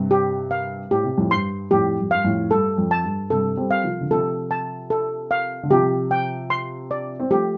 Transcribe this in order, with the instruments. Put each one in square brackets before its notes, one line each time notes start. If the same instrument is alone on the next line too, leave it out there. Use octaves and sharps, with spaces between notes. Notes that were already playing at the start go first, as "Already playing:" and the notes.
Already playing: [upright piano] G2 C3
[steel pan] G4
F5
[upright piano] A2 [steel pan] G4
[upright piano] C3
F2 A2
[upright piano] G2 [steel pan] C6
[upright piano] F2 A2 [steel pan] G4
[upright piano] F2
[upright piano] G2 [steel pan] F5
[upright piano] F2 A2
[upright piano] G2 [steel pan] A4
[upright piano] F2
[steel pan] A5
[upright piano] G2
[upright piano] G2 C3 [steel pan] A4
[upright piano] G3 C4
[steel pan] F5
[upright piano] C3 F3
D3
[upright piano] C3 F3 [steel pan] A4
[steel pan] A5
A4
F5
[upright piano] D3
[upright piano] C3 F3 [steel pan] G4
[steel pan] G5
C6
D5
[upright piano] C4
[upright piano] F3 A3 [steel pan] G4